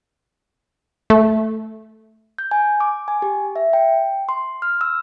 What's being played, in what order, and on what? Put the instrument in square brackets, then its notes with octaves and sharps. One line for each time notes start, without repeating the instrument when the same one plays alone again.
[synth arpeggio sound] A3
[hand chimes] G6
G#5
D6
G#5
G4
E5
G5
C6
F6
E6